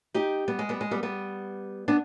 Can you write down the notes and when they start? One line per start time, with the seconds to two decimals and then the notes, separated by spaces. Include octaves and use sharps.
0.14 D#4 G4
0.48 G3 B3
0.59 G#3
0.69 G3 B3
0.81 G#3
0.91 G3 B3
1.03 G3 B3
1.88 B3 D4